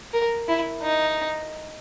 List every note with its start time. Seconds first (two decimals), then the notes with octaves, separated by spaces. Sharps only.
0.13 A#4
0.48 E4
0.82 D#4